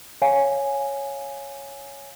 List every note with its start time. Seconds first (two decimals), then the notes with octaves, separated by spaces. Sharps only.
0.22 C#5 F5 G#5